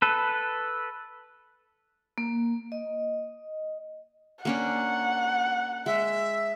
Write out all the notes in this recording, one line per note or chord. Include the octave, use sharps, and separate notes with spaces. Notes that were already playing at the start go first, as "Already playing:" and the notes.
A4 B4
A#3
D#5
A#3 C#4 D4 F#5
G#3 E5